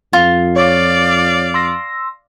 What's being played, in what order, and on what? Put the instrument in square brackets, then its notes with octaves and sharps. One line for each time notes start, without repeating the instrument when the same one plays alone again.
[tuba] F2 [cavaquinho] F4
[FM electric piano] C#5 D6 [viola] D5 F5
[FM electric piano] C6 E6 A#6